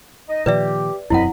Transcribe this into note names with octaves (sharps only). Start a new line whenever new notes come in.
D#4 D#5
A#2 D#3 F3 G4 B4 D5 E5
E1 C2 F#2 C4 E4 D#5 F#5 B5